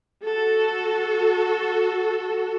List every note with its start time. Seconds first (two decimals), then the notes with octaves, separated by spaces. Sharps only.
0.24 F#4 A4